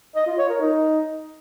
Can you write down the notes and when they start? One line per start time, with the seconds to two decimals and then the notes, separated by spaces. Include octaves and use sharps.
0.15 D#5
0.27 F4
0.38 C#5
0.49 A#4
0.60 D#4